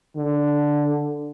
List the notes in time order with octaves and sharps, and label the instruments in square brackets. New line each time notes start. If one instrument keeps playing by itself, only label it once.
[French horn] D3